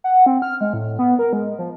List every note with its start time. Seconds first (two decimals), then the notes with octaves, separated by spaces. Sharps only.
0.04 F#5
0.26 C4
0.42 F6
0.61 G#3
0.73 A2
0.99 B3
1.19 A#4
1.33 G#3
1.58 F3